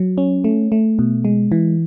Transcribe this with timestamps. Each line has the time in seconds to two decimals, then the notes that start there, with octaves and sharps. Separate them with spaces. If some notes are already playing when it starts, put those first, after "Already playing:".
Already playing: F#3
0.18 C#4
0.44 A3
0.72 A3
0.99 B2
1.25 G#3
1.52 E3